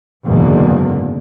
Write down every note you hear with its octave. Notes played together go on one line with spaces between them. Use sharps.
F#1 E2 G#2 B2 D3 A#3